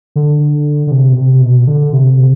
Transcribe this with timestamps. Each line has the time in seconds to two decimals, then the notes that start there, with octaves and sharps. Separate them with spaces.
0.16 D3
0.87 D3
0.91 C3
1.12 B2
1.17 C3
1.41 B2
1.67 D3
1.93 C3
2.18 C3